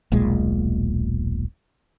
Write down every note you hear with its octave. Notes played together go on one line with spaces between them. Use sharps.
D#1 B1 A#2 G#3